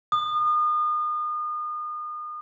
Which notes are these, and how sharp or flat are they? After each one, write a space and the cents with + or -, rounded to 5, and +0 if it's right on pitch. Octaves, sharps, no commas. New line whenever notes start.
D#6 -35